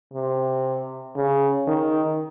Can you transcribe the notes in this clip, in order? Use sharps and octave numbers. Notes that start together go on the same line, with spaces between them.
C3
C#3
D#3